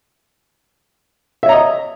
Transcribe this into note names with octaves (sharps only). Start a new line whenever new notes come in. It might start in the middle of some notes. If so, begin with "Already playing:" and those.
C#5 D#5 E5 A#5